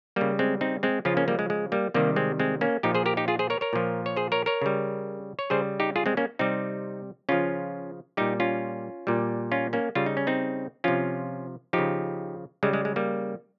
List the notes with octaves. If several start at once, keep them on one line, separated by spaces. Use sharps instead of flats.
C#3 G3 A#3
G#3 C4
C4 D#4
G#3 C4
C#3 F3 C#4 F4
A#3 C#4
G3 A#3
G#3
G#3
G3 A#3
C3 D#3 G3 A#3
G#3 C4
G#3 C4
A#3 C#4
A#2 F3 D#4 G4
G#4 C5
G4 A#4
D#4 G4
F4 G#4
G#4 C5
A#4 C#5
A#4 C#5
A#2 F3
C#5
G#4 C5
A#4 C#5
A#4 C#5
C#3 G3
C#5
C#3 G3 G#4 C5
D#4 G4
F4 G#4
G#3 C4
A#3 C#4
C3 G3 C4 D#4
C#3 F3 C#4 F4
A#2 G3 D#4 G4
C#4 F4
A#2 G3
C#4 F4
A#3 C#4
C#3 G3 F4
D#4
C#4
C4 D#4
C3 F3 C#4 F4
F3 D#4 G4
C#3
C#3 G3 G#3
G#3
G#3
G3 A#3